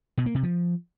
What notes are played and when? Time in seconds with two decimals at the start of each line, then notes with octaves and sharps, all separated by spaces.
0.18 B2
0.26 A#3
0.35 C3
0.43 F3